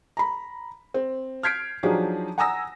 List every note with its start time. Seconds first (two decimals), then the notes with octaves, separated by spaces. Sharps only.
0.17 A#5 B5
0.94 C4
1.43 F6 G6 G#6 B6 C7 D7
1.83 F3 F#3 D4 D#4 G4 G#4
2.38 F#5 G#5 A#5 D#6 E6 A#6